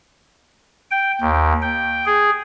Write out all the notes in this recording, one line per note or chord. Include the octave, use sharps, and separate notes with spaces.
G5
D#2
G5
G#4